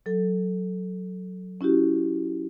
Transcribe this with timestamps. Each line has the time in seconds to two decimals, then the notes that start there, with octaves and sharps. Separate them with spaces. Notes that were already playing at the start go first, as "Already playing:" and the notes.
0.06 F#3 A4
1.61 C#4 E4 F#4 G4